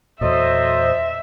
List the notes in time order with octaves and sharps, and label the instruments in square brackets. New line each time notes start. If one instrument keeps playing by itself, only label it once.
[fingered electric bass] E2 A#2 [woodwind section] F#3 A4 D#5 [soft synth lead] C5 [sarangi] E5